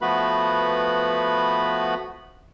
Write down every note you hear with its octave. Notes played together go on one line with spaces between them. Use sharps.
F3 A3 B3 F#4 B4 B5